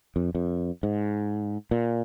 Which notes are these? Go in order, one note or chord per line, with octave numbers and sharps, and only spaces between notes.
F2
F2
G#2
A#2